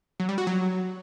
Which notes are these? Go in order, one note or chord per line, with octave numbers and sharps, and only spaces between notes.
F#3
G3
F#4
F#3